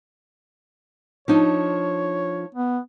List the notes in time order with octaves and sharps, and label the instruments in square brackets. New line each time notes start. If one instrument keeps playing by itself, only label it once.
[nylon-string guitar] F3 D4 D#4 [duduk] C#5
[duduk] B3